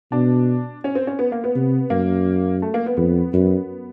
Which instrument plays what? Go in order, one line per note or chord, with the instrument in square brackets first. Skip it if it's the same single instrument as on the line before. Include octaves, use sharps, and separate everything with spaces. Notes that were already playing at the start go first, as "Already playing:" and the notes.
[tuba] B2 [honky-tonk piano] D4
[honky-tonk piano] C#4
C4
C#4
B3
A#3
B3
[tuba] C3
[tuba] F#2 [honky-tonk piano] A#3
[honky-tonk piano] A3
A#3
B3
[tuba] F2 [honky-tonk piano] B3
[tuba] F#2